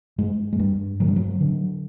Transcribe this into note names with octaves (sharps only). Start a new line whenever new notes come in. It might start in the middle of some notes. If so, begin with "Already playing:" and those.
G2 G#3
G#3
G2 G3
D3 F#3
G3
F#3
D3